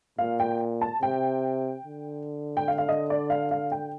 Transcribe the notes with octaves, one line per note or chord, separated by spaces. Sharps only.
A#2 F5
G5
A5
C3 G5
D3
G5
F5
F5
D#5
D5
F5
F5
G5